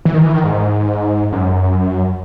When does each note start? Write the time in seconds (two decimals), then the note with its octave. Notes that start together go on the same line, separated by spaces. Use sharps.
0.05 E3
0.14 D#3
0.23 E3
0.34 D#3
0.44 G#2
1.32 F#2